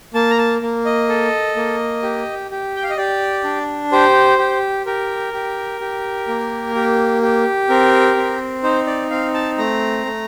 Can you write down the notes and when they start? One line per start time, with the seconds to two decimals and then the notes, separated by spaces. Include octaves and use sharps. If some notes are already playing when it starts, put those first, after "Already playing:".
0.14 A#3 A5
0.30 A#5
0.38 A5
0.61 A#3
0.85 D#5
1.09 A4
1.56 A#3
2.03 G4
2.51 G4
2.76 G5
2.83 F5
2.90 D#5
2.97 G4 D5
3.44 D4
3.92 G4 C5
4.39 G4
4.86 G4 A#4
5.33 G4
5.81 G4
6.28 A#3
6.75 G4
7.22 G4
7.69 C4 A#4
8.16 C4
8.63 D#4 C5
8.87 D5
9.10 C4 F5
9.34 A5
9.58 A3 A#5
10.05 A3